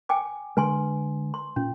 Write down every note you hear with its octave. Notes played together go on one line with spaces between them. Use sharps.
G5 G#5 D6
D3 G#3 B4 G#5 C6
C6
A#2 C#4